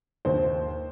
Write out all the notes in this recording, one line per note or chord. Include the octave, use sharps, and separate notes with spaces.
D#2 C5